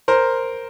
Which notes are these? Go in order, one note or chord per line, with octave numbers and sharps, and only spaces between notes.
A#4 C5